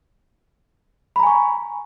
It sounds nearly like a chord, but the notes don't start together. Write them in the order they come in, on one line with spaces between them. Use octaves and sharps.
B5 A#5 G#5 C#6